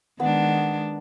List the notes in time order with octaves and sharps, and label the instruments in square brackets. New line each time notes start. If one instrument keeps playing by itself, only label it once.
[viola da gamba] D#3 G#3 D4 [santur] B3